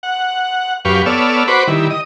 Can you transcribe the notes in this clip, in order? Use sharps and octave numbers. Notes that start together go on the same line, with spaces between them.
F#5
F#2 G4 B4 F5 C#6
B3 A4 C#5 D5 E6 F6
F#4 B4 C5 B5 C#6 D6
D#3 G3 E4
D#5